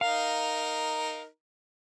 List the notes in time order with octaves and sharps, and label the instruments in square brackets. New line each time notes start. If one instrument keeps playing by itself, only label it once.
[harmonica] D#4 A#4 [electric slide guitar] F5